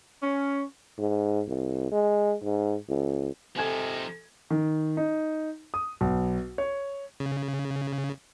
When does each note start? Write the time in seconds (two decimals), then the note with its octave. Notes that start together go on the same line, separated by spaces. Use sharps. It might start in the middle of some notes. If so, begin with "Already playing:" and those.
0.22 C#4
0.98 G#2
1.48 C2
1.91 G#3
2.43 G#2
2.89 C#2
3.56 C3 F3 D#4 A4 G#5 G#6
4.50 D#3
4.97 D#4
5.74 D#6
6.01 B1
6.58 C#5
7.20 C#3